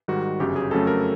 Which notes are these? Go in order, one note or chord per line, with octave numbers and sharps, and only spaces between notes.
G#2 D#3 G3 F#4
G1 F#2 C#3 G4
G#4
F2 C#3 F#3 A3 C#4 A4
A#4